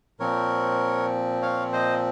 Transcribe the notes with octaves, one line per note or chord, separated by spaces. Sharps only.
A#2 F3 C4 A#4 C#5
C#5 F5
C5 D#5